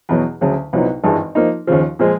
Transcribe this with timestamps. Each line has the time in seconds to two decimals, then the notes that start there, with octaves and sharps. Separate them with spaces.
0.09 E2 B2 F#3
0.41 D2 C#3 F#3
0.73 C2 A#2 F#3 B3 D#4
1.04 G#1 G2 E3 G#3
1.35 F3 A#3 D#4
1.67 D#2 C#3 F3
1.99 A#2 F3 G#3